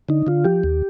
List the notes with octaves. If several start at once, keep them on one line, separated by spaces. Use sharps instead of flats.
D3 D#4
D3 F4
F3 G4
D#2